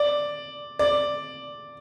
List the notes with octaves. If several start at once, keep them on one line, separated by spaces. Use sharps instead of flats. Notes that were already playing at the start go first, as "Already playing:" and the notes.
Already playing: D5
D5